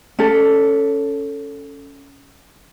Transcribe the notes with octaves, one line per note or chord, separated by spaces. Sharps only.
C#4 A4